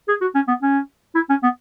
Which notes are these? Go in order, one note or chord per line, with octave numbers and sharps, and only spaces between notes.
G#4
F#4
C#4
B3
C#4
E4
C#4
B3